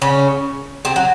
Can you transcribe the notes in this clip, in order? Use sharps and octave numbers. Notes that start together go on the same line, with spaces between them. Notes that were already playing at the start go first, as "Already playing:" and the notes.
C#3 C#4
C3 C4
F#3